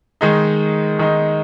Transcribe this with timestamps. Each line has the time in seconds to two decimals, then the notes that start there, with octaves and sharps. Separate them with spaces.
0.21 D#3 G#3 D#4
0.99 D#3 G#3 D#4